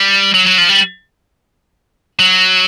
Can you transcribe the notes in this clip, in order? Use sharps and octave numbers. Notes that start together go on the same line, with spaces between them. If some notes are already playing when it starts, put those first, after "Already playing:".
Already playing: G3
F#3
F#3
F3
G3
F#3